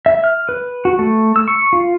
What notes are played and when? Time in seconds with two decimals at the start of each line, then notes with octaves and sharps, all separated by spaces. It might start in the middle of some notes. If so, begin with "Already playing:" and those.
0.06 E5
0.24 F6
0.49 B4
0.85 F#4
0.99 A3
1.36 E6
1.48 C#6
1.73 F4